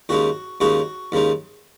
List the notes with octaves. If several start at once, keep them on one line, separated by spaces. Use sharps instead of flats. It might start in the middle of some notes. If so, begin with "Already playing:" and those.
D#2 C#3 G#3 D#4 F#4
D#2 C#3 G#3 D#4 F#4
D#2 C#3 G#3 D#4